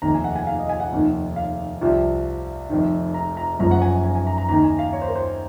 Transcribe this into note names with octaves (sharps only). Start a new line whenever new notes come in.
F1 D#2 D#3 A#5
G#5
F#5
G#5
F5
D#5
G#5
F#5
F1 D#2 D#3
F5
C2 C3 F3
F1 F2 D#3
A#5
A#5
F#1 F#2 F3 A#5
F#5
G#5
G#5
G#5
A#5
A#5
D#2 D#3 A#5
G#5
F5
C#5
C5
A#4
C5